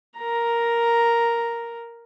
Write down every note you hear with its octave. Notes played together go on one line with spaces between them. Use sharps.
A#4 A#5